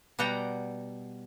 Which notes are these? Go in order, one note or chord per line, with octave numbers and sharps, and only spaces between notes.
B2 G3 F#5 G5 A#5